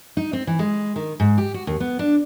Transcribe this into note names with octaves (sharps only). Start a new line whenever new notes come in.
D#4
C4
E3
G#3
D#3
G#2
G4
F#4
D#2
B3
D4